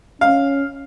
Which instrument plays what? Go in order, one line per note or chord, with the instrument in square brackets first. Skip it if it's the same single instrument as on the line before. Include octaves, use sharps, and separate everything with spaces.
[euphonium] C#4 [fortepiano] F5